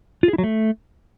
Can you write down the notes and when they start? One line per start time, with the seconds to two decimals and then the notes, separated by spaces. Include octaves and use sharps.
0.23 F4
0.28 G#4
0.33 E4
0.38 F#3
0.44 A3